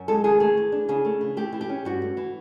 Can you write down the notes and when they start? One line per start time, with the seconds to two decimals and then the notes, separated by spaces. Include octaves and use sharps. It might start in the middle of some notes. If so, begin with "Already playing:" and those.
Already playing: F#2
0.08 G#3 A4
0.24 D#3 G#4
0.40 A3 G#4
0.57 E3
0.72 D4
0.89 C#3 G#4
1.05 A3
1.21 E3
1.37 A3 G4
1.52 E3
1.61 G4
1.69 C#4
1.85 G2 F#4
2.02 A3
2.17 E3